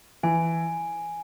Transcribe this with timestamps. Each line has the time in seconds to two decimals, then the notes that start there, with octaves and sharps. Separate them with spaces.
0.23 E3 G#5